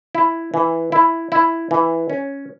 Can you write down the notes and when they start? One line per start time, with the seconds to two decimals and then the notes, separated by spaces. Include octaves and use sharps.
0.15 E4
0.54 E3
0.92 E4
1.32 E4
1.71 E3
2.10 C#4